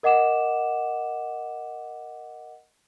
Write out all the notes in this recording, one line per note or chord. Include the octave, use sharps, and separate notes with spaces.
A#4 D#5 F#5 D6 E7